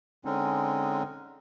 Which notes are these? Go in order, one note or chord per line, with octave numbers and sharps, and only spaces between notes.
D3 G#3 C4 C#4 D#4